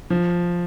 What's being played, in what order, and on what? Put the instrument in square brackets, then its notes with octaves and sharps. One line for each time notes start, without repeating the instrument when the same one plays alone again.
[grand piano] F3